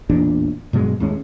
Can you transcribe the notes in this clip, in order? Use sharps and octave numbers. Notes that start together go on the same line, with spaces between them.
A1 E2 A#2 D4
G2 B2 F#3 G#3
D#2 A2 G#3 C#4